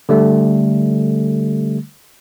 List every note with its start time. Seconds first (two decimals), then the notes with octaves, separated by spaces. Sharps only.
0.09 D3 G3 A3